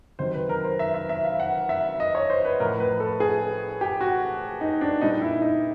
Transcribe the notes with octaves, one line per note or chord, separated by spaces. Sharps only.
C3 D#3 F#3 C5
B4
A#4
C5
E5
E5
E5
F5
F#5
E5
D#5
C#5
C5
B4
A2 F3 A#4
B4
A4
G#4
G4
F#4
D#4
D4
A#2 G3 D#4
E4
D#4